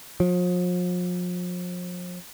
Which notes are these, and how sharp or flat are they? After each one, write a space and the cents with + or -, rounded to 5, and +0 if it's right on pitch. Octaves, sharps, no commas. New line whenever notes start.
F3 +40